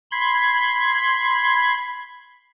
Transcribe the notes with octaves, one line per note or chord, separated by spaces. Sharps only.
B5 C6 G#6